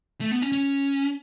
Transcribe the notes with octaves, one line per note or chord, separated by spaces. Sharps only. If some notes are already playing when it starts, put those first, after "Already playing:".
A3
B3
C#4
C#4